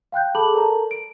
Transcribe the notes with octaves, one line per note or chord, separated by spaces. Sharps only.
F5 G5 F#6 G6
G#4 A4 A5 B5 D6 F#7
A4 A#4 D5 A5 A#5
D7